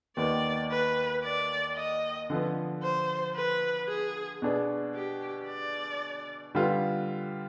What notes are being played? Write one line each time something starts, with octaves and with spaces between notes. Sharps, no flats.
D#2 D#3 B3 D5
B4
D5
D#5
D3 F3 B3
C5
B4
G#4
B2 B3 D4 G#4
G4
D5
D3 G3 B3 F4